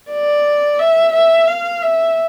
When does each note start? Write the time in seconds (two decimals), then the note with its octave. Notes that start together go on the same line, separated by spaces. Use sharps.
0.11 D5
0.79 E5
1.13 E5
1.47 F5
1.82 E5